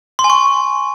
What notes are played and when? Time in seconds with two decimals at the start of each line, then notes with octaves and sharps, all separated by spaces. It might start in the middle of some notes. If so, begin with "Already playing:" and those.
0.19 C6
0.24 G#5
0.30 C#6